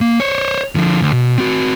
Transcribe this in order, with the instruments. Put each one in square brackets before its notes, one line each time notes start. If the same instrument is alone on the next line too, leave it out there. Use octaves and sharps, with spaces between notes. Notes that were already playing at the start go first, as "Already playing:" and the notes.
[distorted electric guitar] A#3
C5 C#5
D3 F3
D2
B2
C4 F#4